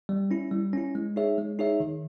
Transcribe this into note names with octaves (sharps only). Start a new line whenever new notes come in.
G3
C#4 E4
G3
C#4 E4
G#3
D#4 G#4 C#5 E5
G#3
D#4 G#4 C#5 E5
D#3